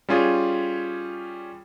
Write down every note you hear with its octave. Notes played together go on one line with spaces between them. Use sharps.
G3 C#4 F4 G#4